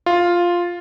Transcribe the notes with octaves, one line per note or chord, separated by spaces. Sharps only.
F4